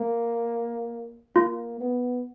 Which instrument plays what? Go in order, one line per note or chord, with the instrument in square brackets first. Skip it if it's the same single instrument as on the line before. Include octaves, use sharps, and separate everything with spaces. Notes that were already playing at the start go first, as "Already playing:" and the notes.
Already playing: [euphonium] A#3
[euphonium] A#3 [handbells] F4
[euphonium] B3